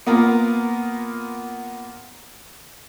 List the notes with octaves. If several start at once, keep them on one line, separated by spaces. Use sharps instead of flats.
A#3 B3 F4 A#4